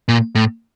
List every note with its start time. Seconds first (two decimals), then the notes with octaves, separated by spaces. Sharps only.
0.08 A#2
0.35 A2